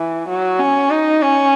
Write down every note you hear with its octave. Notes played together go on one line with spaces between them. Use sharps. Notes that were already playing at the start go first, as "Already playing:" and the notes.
Already playing: E3
F#3
C#4
D#4
C#4